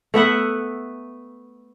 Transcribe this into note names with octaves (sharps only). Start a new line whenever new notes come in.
A3 B3 E5 F#5